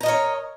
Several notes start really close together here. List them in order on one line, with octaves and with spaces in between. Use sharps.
A#5 D#5 A#4 C#5